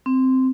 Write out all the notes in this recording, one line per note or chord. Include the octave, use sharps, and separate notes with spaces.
C4